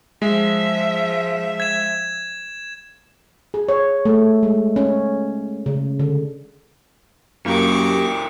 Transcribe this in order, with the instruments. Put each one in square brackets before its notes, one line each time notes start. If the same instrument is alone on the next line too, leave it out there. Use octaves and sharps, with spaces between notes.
[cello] F3 E5 [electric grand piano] G#3
[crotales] G#6 E7
[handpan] G#4
C#5
A3
G#3
C#4
C#3
D3
[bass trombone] F#2 [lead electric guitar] E3 A#4 [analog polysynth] A#3 G4 [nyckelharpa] C#6 D6